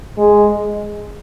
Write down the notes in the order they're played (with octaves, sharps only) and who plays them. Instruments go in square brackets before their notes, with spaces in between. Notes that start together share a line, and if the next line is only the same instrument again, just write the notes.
[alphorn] G#3